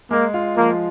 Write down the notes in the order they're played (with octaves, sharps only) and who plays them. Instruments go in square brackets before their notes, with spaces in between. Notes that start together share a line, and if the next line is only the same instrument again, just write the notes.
[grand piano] G#3 [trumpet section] A#3
[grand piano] F4
[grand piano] F3 [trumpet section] A#3